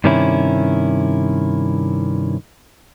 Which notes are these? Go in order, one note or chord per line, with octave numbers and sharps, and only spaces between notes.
G2 C3 D#3 C#4 E4